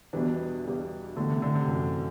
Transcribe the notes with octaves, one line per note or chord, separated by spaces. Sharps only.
E2 B2 E3 G3 D4
E2 B2 G3 D4
A2 D3 E3 A3
C3
D3
C3
F#2 A2 E3 A3